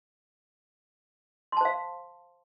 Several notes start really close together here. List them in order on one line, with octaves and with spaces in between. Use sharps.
C6 A5 C5 F5